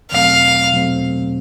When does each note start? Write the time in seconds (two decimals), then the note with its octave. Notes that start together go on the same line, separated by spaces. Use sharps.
0.12 E2 B2 F#3 A3 C4 F5
0.73 E2 B2 F#3 A3 C4